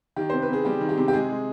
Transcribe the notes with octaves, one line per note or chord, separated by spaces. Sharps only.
D#3 G4
C3 C5
B4
C3 G#4
G3 G4
D#3
G4
C3
G4
G#3 G#4
G#3